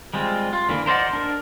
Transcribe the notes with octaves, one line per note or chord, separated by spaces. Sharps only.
G3 G#3 C4 F4
F4
D3 E3 A#3
A#4 C5 D5 D#5 F#5
D4 A#4